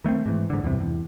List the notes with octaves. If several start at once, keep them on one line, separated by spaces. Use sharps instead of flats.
D#3 A3 A#3 C4
G#2 E3
G#2 D3
E2 G2 C3
E2